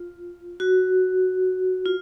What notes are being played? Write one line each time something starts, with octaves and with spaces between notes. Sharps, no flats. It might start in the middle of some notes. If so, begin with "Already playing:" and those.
Already playing: F4
F#4
F4